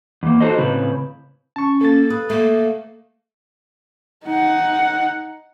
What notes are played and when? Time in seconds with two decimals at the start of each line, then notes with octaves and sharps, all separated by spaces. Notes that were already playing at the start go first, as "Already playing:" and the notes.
0.23 E2 A#3
0.41 D#4 F#4 A4 C5 D#5
0.58 A2 C#3 C4 B4
1.56 C#4 A5 C#6
1.81 A#3 A4 A6
2.10 B4 D#6
2.30 A3 A#3
4.24 D#4 F#5